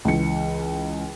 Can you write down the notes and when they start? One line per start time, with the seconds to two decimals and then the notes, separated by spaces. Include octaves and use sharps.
0.05 C#2 E3 C#7